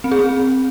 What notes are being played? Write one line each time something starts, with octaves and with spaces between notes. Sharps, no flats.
C4
G#4
C4